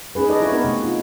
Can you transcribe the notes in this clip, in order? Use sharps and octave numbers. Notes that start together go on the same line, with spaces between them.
C#4 D#4 G#4 B4
D#4 G#4 A4 B4 D5 D#5
D4 E4 F#4 B4 C#5
B3 C4 D#4 F#4 A#4 B4
C3 A3
D#4 F4